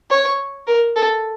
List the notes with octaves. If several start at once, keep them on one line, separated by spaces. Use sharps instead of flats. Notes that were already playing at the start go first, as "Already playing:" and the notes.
C#5
A#4
A4